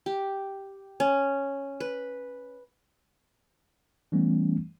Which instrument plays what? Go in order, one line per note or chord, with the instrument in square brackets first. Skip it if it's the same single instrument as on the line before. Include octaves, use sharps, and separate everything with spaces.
[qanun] G4
C#4
B4
[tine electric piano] E3 G3 A3 B3 C#4